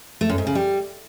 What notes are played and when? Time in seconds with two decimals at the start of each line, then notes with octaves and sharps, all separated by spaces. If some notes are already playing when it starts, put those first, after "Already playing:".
0.21 A3
0.29 F#2
0.38 G#2
0.47 C#3
0.55 G3